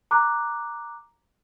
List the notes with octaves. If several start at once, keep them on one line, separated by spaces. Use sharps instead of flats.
A#5 D6 F#6